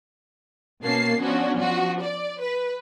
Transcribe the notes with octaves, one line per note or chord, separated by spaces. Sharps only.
B2 A#3 C#4 A5 C7
F3 B3 C#4 D4 F#4
F3 F#4
D5
B4